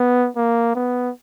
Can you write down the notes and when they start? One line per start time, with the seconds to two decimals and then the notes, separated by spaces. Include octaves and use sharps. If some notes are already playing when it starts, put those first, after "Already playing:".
Already playing: B3
0.36 A#3
0.75 B3